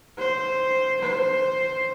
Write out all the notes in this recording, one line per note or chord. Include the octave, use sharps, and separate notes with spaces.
C5
C5